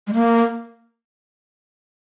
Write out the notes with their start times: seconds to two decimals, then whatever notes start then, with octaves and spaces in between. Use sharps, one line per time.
0.07 G#3
0.14 A#3